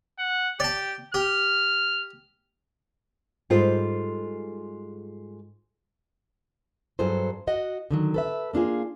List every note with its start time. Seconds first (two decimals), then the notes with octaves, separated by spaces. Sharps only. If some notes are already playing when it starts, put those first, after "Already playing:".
0.19 F#5
0.60 G4 D5 A5
1.14 G4 F6
3.50 G#2 G3 F4 G#4 A4 C5
6.99 G2 F#3 G#4 A4 C5
7.47 F#4 D#5 F#5
7.91 D3 D#3 F#3
8.14 A4 B4 E5
8.53 A#3 D4 F4 G#4